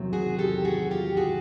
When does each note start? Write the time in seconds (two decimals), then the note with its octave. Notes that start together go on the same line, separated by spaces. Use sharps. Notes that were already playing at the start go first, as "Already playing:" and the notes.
Already playing: E2 C3 D#3 F#3
0.13 F#4 G#4
0.39 G4 A4
0.65 F#4 G#4
0.91 F4 G4
1.17 F#4 G#4